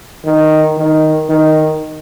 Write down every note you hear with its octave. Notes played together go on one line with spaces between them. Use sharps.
D#3
D#3
D#3